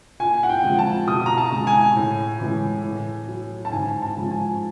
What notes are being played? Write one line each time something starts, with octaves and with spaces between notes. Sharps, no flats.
A#2 G#5
F#5
G5
F3 G#3
A5
B2 D#6
A#5
A5
G#3
G#5
A2
E3 G#3
A2
F#3
A5
G#2 G#5
A5
F3 G#3
G#5